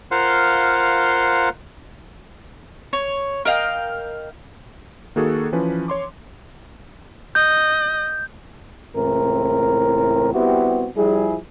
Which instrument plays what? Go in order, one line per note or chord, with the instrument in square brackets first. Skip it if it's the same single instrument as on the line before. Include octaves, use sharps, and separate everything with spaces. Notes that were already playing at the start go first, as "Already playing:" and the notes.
[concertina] F4 A#4 C5 F5 F#5 C6
[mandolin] C#5
A#4 D#5 F5 G5
[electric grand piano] D#3 A#3 F#4 G#4 A4
E3 F3 C#4 B4
C#5 C6 D6
[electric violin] D#5 [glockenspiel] G6
[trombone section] C#2 A2 E3 C4 A#4
G3 B3 C4 E4 F#4 G4
F3 G3 E4 G#4